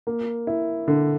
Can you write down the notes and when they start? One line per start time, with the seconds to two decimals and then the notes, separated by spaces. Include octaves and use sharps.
0.07 A#3
0.47 E4
0.88 D3